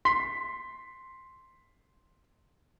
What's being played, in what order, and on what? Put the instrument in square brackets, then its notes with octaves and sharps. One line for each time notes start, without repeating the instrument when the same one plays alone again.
[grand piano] C6 B6